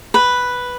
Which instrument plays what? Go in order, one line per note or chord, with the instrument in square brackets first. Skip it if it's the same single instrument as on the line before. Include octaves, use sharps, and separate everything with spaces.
[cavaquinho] B4